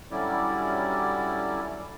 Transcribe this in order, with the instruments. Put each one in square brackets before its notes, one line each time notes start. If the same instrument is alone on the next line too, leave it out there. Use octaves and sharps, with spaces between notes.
[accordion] D3 F#3 G3 C#4 E4 D5